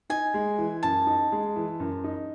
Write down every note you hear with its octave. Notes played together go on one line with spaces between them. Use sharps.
D#4 G#5
G#3
E3
F#2 A5
D#4
G#3
E3
F#2
D#4